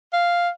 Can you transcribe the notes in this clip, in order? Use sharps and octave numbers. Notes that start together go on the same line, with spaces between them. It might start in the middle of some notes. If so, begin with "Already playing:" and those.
F5